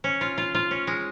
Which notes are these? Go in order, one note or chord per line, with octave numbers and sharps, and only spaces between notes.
C#4
F4
F4
F4
C#4
G#3